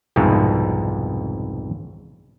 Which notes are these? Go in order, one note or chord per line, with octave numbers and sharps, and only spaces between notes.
C2 F2 G#2 B2